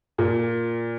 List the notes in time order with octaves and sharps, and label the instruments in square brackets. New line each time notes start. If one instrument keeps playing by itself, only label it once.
[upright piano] A#2